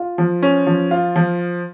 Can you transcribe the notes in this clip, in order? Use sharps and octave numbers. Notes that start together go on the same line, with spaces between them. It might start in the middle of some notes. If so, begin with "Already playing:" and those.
Already playing: F4
F3
C#4
F3
F4
F3